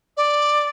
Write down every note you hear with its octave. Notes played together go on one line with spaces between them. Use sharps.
D5